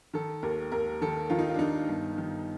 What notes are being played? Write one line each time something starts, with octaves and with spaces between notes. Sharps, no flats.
D#3 A4
D#2 A#4
D#2 A#4
D#3 A4
D#3 F4
D#4
F4
D4
D#3 D#4
G1
D#3